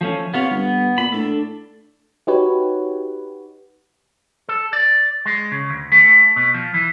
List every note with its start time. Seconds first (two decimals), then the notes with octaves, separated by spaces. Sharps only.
0.01 F3 A3 C#4
0.34 C3 B3 F4 C#5
0.50 G1 B3
0.98 A#2 B5
1.12 A2 D4 A4
2.27 D#4 F#4 G4 B4 C#5
4.49 A4
4.73 D5
5.26 G#3
5.52 C#3
5.70 D2
5.92 A3
6.36 B2
6.54 F3
6.74 E3